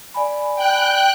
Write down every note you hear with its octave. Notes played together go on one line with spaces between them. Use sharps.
D5 G#5 B5
G5 F#6